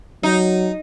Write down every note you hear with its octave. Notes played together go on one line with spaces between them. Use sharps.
F#3 D#4